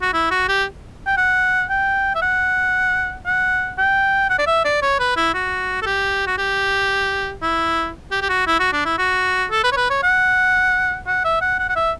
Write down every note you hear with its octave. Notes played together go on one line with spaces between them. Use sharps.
F#4
E4
F#4
G4
G5
F#5
G5
E5
F#5
F#5
G5
F#5
D5
E5
D5
C#5
B4
E4
F#4
A4
G4
F#4
G4
E4
G4
G4
F#4
E4
F#4
D4
E4
F#4
A4
B4
C#5
B4
C#5
F#5
F#5
E5
F#5
F#5
F#5
E5